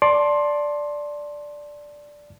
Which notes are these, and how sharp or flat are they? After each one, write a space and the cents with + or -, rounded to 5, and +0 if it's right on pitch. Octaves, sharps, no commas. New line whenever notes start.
D5 +0 A5 +0 C6 +15